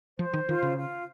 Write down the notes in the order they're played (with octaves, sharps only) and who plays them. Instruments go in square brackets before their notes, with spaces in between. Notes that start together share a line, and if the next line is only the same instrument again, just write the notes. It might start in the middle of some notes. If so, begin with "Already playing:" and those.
[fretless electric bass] F3 [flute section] C5
[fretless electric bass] D#3
[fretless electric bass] D#3 [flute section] F4
[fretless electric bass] C#3
[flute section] F4